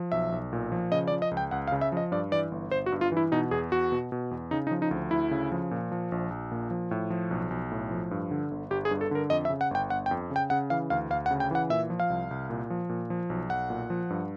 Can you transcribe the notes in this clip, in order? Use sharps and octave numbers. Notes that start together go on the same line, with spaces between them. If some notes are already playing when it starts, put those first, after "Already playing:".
Already playing: F3
B1 E5
B1
A#2
F3
C#3 D#5
D5
F3
D#5
C#2
G5
C#2 F#5
F5
C#3
E5
F3 D#5
G2 D5
E3 D5
G1
G1 C5
F#4
G2
F4
E3 E4
B2 D#4
E2 G#4
E2 F#4
B2
B2
E2
C#3 D#4
D#4
F3
D#4
D2
D2 E4
C#3
F3
A#2
F3
A#1
A#1
A#2
F3
A2
F3
B1
B1
A2
F3
G2
D3
G1
G1 G4
G#4
G2
A4
D3 A#4
F2 D#5
E5
C#3
F#5
G1 G5
G1 F#5
G5
F2
C#3
G5
C#3 F#5
E3 F5
D2 F5
D2 F5
F#5
C#3
G5
E3 F#5
A#2 E5
F3
F5
C2
C2
A#2
F3
A#2
F3
B1
B1 F#5
A#2
F3
G2